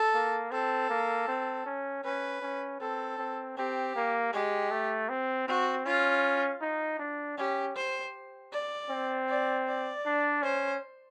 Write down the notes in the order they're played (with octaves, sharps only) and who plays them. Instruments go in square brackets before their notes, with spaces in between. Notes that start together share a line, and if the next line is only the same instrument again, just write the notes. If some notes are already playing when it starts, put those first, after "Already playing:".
Already playing: [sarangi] A4
[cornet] A#3
[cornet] C4 [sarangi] A4
[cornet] A#3
C4
C#4
[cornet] C#4 [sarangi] B4
[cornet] C#4
[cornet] C4 [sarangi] A4
[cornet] C4
[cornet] C4 [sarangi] G4
[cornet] A#3
[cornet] G#3 [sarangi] G4
[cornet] A3
C4
[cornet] C4 [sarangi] F#4
[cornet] C#4 [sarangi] F4
[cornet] D#4
D4
[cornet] C#4 [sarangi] G4
[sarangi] C5
D5
[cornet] C4
[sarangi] D5
D5
[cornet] D4
[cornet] C#4 [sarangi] C5